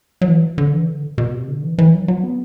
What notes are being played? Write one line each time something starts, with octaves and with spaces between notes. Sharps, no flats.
F#3
E3
D3
E3
D3
B2
C3
D3
E3
E3
F#3
F#3
B3